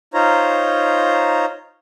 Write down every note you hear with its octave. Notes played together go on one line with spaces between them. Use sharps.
D#4 F4 C5 C#5 A#5